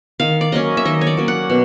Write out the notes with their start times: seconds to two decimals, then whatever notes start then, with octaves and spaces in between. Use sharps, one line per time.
0.20 D#3 F5
0.41 D5
0.52 F#3 A#3 C#4 D#5
0.77 E5
0.85 D#3 D#5
1.01 C#5
1.07 D5
1.17 F#3 A#3 C#4
1.28 F#5
1.50 B2